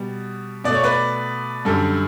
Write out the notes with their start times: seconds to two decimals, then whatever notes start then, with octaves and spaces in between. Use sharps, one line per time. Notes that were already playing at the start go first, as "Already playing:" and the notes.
Already playing: B2 G3
0.64 B2 A3 D5
0.74 C#5
0.83 B4 D5
1.65 F#2 D3 G3 A4